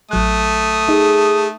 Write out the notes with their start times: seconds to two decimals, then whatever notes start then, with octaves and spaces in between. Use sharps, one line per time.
0.11 A1 F#3 A3 D#6 F#6
0.89 D#4 G#4